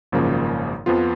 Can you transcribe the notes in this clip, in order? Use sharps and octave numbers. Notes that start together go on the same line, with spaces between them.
G#1 F#2 C#3 F3 A#3
F2 F3 B3 F4